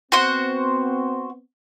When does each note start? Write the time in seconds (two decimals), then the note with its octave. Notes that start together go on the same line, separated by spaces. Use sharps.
0.12 B3 C4 F#4 C5 F#5